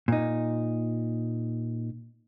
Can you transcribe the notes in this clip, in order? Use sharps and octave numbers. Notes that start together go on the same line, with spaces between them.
A#2 D#4